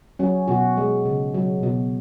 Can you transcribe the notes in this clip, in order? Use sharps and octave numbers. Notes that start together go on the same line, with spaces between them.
F#3 C#4
B2 F#4
G#3
C#3
F#3
B2